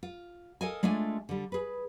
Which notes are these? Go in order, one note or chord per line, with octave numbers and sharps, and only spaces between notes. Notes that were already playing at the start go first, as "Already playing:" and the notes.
F4
A4 A#4 D#5 F5 G#5
G#3 A3 D4 F4 G#5
D3 G3
G#4 B4